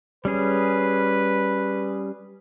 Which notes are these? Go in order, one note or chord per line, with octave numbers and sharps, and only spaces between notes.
G3 C#4 G#4 B4